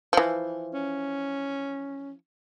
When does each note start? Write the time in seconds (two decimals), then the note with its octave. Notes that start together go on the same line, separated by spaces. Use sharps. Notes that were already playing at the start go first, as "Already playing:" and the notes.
0.13 E3 F3
0.74 C#4